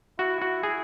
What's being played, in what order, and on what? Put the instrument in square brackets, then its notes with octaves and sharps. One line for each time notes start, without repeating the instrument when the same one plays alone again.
[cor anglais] E4 [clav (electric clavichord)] F#4
[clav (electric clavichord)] F#4
G#4